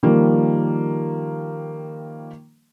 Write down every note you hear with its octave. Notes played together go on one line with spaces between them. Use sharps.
D#3 F3 G3 A#3